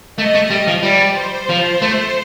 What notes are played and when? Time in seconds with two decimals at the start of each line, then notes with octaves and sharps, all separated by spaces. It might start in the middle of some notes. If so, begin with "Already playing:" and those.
0.18 A3 D#5
0.35 A3
0.50 G3
0.68 F3
0.83 G3 D5
1.16 C5
1.49 F3
1.82 A3